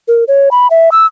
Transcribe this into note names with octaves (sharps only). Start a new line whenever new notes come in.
A#4
C#5
B5
E5
E6